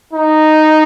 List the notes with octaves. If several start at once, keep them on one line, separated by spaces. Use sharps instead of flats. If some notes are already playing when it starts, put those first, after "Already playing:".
D#4